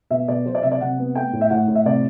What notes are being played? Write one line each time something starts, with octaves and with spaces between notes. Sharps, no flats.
B2 E5
B2 D5
F#3 C5
D5
C3 E5
D5
C3 F#5
B3
A3 G5
A2
E5
A2 F#5
A2
E5
C3 D5